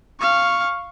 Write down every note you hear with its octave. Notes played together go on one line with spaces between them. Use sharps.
F5 C#6